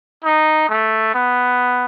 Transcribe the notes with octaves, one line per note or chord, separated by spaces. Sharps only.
D#4
A3
B3